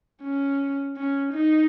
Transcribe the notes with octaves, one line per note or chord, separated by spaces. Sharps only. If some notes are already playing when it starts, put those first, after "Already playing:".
C#4
C#4
D#4